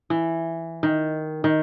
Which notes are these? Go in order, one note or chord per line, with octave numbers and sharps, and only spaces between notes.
E3
D#3
D#3